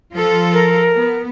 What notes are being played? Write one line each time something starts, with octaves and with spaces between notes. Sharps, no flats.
F3 F4 A4
A#4
B3